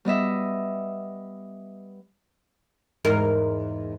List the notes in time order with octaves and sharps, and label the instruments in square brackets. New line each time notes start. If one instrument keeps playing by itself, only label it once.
[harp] G3 B3 D#5 E5
[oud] E2 G#2 A#4